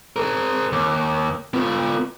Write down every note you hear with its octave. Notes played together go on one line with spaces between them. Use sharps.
G#4 A#4
D#2
B3 F4